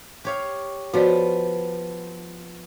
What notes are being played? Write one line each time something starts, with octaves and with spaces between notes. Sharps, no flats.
G4 C#5 F5
F3 B3 F#4 C#5 D5